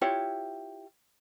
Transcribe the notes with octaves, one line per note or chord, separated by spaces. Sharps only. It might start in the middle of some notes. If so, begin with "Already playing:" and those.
E4 F4 G4 C#5